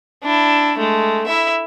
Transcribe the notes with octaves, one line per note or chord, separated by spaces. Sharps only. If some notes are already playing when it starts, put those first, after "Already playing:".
D4 E4
G#3 A3
E4 E5